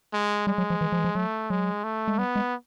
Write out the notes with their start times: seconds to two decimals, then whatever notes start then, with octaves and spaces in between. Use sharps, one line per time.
0.13 G#3
0.47 G3 G#3
0.58 F#3
0.70 F3
0.81 E3
0.92 F3
0.99 E3
1.04 F3
1.15 F#3 A3
1.50 F#3 G#3
1.84 A3
2.08 G#3
2.18 G3 B3
2.36 G#3